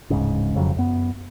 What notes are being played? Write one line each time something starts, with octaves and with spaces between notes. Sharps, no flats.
D1 G#2 C#3
E1 F2 C#3 F#3
F#2 B3